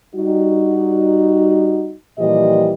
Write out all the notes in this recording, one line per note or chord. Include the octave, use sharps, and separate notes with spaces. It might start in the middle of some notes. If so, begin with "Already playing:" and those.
G3 D#4 F#4
A#2 E3 F3 G3 G4 D#5